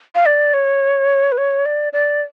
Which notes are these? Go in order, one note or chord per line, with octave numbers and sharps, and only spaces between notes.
F5
D5
C#5
B4
C#5
D5
D5